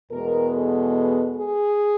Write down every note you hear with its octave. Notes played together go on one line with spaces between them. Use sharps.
E2 B2 G#3 B3 A#4
A4
G#4